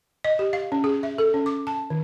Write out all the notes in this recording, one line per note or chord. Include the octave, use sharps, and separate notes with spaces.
D#5
G4
F5
C#4
G#4
E5
A4
C#4
D6
A5
D#3